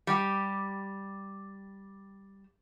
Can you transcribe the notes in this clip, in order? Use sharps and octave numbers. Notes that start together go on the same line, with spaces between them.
G3 G4